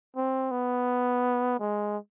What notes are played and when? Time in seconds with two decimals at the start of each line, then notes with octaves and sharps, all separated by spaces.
0.16 C4
0.52 B3
1.59 G#3